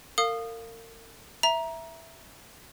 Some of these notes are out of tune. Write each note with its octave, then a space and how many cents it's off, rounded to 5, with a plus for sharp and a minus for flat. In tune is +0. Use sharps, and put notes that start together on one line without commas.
A#4 -40 F5 +0 D#6 -20
E5 +0 A#5 +15